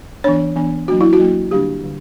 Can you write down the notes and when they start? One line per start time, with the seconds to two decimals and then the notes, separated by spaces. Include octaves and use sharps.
0.24 E3 B3 D4 C#5
0.56 E3 B3 D4
0.88 F#3 A#3 D4 F#4
1.01 E4
1.13 F#4
1.19 F#3 A#3 D4
1.51 D3 G3 A#3 D4 G4
1.83 D3 G3